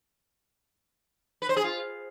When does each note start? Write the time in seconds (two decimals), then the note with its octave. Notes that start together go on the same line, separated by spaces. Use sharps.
1.42 B4
1.49 C5
1.56 G#4
1.64 F4